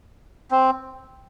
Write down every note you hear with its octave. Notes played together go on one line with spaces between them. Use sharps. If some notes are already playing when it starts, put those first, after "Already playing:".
C4